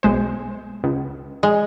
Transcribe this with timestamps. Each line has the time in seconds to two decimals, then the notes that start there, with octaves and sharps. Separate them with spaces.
0.03 B1 G#3 C5
0.84 C#2
1.43 G#3